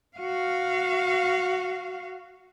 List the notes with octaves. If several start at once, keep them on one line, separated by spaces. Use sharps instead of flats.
F#4 F5